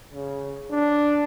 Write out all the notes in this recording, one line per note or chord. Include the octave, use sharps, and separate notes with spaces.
C#3
D4